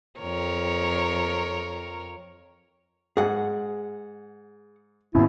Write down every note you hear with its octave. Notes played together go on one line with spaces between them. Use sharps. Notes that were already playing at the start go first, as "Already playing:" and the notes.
F2 A#4 C#5
G#2 G#4 F#5
D#2 G#2 B2 C#4 E4